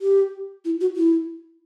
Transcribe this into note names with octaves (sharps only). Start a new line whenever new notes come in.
G4
E4
F#4
E4